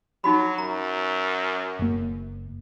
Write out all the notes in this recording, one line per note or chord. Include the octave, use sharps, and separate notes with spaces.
F#3 D#4 F#4 B5
F#2 A#5
F#1 A#3